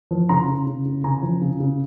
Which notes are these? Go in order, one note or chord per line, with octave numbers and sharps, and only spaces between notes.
F3
C#3 A#5 C6
C#3
C#3
C#3
C#3 G#5 A#5
F3
C#3
C#3